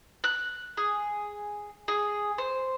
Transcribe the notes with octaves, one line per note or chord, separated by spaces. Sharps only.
F#6
G#4
G#4
C5